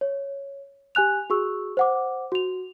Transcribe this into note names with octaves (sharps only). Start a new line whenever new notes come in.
C#5
G4 G#5 F#6 F7
F#4 G#4 C#6 E6
C5 F#5 D6
F#4 F7